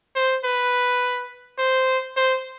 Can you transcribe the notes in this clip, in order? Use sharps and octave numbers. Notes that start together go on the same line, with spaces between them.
C5
B4
C5
C5